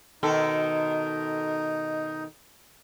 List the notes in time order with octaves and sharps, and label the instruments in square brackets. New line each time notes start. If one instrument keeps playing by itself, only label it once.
[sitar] B2 D#3 A4 [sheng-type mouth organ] D#4